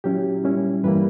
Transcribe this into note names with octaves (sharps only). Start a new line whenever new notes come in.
A#2 F#3 C#4 E4 G4
A#2 G3 C#4 E4
G2 E3 G3 A#3 E4 B4